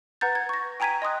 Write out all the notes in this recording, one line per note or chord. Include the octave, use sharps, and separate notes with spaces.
B4 F#5 A#5 G6 A6
G#6
C#6 A#6
G5 G#5 A#5 G#6 B6 D#7
D#5 C6 D#6 F#6